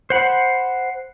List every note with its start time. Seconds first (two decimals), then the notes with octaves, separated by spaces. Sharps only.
0.10 C5 F#5 B5